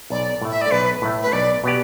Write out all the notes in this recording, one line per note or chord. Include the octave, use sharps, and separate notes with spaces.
B1 D5
A2 A3
E5
D5
B1 B4
A2 A3
B4
B1 D5
B2 B3 G4 D5